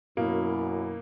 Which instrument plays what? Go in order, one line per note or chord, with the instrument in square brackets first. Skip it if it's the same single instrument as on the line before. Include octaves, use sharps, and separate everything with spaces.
[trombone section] F#2 [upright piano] B2 A#3 [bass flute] E4